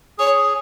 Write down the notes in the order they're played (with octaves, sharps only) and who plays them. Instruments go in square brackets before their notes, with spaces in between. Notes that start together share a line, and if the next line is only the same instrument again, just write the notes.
[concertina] G#4 [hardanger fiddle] C#5